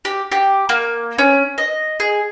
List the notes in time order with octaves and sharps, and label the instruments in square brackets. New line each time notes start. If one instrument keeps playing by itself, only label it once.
[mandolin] G4
G4
A#3
C#4
D#5
G#4